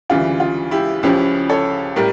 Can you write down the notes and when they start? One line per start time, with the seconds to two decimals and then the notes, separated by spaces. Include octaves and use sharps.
0.10 D2 C#3 E3 G3 F4
0.40 F4
0.71 E4 G4
1.03 C#2 C#3 F3 C#4 E4 G4
1.49 A4 C#5
1.96 A2 G3 G4 A#4